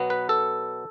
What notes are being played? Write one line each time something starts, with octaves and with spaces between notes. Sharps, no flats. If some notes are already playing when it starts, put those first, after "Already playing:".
Already playing: B2 F#3 B3
B4
A4